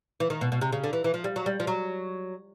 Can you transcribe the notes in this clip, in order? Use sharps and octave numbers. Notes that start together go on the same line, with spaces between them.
E3
D#3
B2
B2
C3
C#3
D3
E3
E3
F3
G3
F#3
G3
F3
F#3